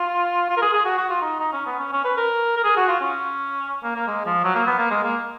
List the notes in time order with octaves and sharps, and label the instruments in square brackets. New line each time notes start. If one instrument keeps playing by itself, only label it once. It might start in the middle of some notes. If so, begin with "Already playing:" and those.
Already playing: [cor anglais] F4
F4
A#4
G#4
G#4
F#4
F#4
F4
D#4
D#4
C#4
B3
C#4
C#4
B4
A#4
A#4
G#4
F#4
F4
C#4
A#3
A#3
G#3
F3
F#3
A#3
B3
A#3
G#3
A#3